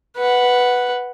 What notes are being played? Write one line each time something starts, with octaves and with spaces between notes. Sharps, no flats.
B4 F#5